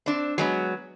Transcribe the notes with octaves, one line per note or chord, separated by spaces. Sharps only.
C4 D4
F#3 G#3 B3